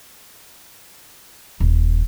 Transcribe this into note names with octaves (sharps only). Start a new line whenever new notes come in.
D#1